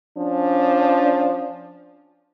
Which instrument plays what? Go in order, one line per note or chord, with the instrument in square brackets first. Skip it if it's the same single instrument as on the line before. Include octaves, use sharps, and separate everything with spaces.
[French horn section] F3 C#4 D4